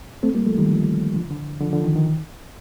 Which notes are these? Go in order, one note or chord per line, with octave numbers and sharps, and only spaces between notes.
A3 C4
G3 A#3
F3 A3
D#3 G3
D3 F3
D3 F3
D3
D3 F3
D3 F3
D#3
D#3